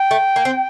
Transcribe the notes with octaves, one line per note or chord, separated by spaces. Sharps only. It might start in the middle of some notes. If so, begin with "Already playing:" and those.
Already playing: G5
A3
A#3
C4